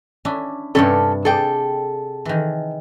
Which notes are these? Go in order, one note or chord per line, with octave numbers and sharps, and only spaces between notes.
C#4 D4 E4
G2 C3 G3 C4 C#4 A4
G#4 A4 D5 G5
D#3 E3